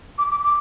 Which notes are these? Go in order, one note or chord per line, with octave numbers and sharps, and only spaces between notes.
D6
D6
D6